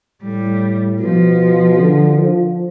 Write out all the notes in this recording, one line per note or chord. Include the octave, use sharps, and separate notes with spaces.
A2 G3
B2 F3
D3
F3